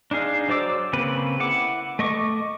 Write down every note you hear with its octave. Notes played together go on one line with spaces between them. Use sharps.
D4 D#4 G#4 F5
F#3 C5 D5 D6 E6
C#3 A#3 C4 B4
E4 F#5 D6
A3 D#5 C#6 D6